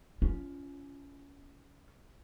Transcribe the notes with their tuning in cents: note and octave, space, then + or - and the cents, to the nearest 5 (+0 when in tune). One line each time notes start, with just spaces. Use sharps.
C#4 +20 F4 -20